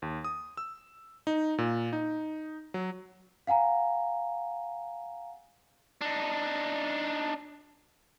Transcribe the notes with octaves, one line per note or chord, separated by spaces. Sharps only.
D#2
D#6
E6
D#4
A#2
D#4
F#3
F5 F#5 G#5 A#5
D4 D#4